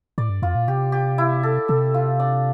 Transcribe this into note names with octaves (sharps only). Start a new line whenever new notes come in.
A2 D5
G2
F2 F4
A#2
C3 G4
G4
E4
A4
C3 A4
F4
D4